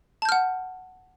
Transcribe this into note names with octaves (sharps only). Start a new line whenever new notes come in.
F#5 A5 F6 G6